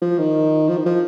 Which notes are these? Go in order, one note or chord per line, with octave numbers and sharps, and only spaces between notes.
F3
D#3
F3
D#3
F3